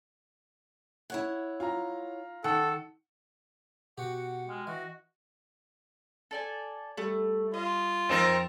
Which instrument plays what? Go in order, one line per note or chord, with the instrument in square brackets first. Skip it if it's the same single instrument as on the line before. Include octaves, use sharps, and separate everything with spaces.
[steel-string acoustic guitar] E4 C#5 F#5
[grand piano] F4 A#5
[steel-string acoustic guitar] D#3 [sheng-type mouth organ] A4 [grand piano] F#5
[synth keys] B2 [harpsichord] F#4 G4 [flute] F#5
[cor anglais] G#3 [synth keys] G5 F6
[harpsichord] E3 [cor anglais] F#4 [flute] D#5
[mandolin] A4 D5 G#5
[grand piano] G3 [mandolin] A3
[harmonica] F4 [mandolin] D#5
[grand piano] F2 A6 E7 [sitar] C4 D#4 A#4